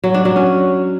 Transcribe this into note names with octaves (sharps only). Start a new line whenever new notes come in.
F#3
D4
F#3
C#4